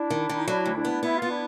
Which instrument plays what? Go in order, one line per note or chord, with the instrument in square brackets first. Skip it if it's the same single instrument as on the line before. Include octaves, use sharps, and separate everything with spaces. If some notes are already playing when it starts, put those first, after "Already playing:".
Already playing: [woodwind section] D4 E4
[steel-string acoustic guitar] D#3
D#3
[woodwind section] D#4
[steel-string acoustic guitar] F#3 [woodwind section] D4 E4
[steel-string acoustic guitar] D2
[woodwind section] D4 E4
[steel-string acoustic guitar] B3
[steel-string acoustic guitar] B3 [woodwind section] E4
[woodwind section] F4
[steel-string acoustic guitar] B3
[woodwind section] D4 E4